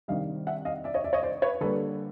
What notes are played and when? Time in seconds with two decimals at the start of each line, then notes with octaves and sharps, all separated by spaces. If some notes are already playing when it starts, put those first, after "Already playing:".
0.08 C3 D#3 G3 D#5 F5
0.47 E5 F#5
0.65 D#5 F5
0.84 D5 E5
0.94 C#5 D#5
1.04 D5 E5
1.13 C#5 D#5
1.23 C5 D5
1.42 B4 C#5
1.61 D3 G3 A#3 A4 B4